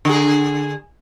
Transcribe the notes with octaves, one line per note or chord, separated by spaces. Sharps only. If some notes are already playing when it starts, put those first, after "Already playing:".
D3 G#4